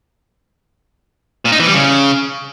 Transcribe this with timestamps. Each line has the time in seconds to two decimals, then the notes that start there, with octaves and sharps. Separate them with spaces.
1.45 A#2
1.52 D#4
1.60 E3
1.67 G3
1.74 C#3